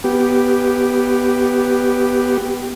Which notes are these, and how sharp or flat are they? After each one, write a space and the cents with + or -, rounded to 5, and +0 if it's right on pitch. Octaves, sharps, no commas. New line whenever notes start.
B3 +0 G4 +0